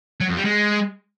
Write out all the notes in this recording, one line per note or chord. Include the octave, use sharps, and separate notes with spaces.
F#3
F2
G3
G#3